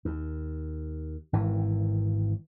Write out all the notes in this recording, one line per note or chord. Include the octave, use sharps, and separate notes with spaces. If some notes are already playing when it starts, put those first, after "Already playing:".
D#2
G#1 E3